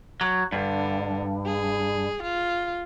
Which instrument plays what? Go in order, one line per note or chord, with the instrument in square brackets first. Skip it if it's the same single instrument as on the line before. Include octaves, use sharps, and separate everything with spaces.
[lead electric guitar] F#3
[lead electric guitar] G2 [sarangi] D3
[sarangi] G#4
F4